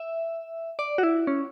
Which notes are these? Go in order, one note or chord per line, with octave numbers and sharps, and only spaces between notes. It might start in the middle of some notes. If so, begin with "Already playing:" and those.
Already playing: E5
D5
F#4
E4
C#4